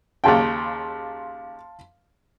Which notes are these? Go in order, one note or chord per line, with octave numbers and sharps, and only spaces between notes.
D#2 C#3 F5 G5 A5 C6